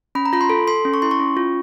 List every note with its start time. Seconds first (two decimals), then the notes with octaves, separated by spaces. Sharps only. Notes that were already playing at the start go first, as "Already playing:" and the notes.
0.15 C#4 B5
0.25 A#5
0.33 F4 B5
0.41 C6
0.50 A4
0.68 A4 C6
0.85 C#4
0.94 C#6
1.02 E4 C6
1.11 C#6
1.20 C#4
1.37 F4